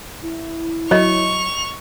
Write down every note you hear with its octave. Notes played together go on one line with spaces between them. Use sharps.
E4
F#3 C#5 D#5 C#6 F7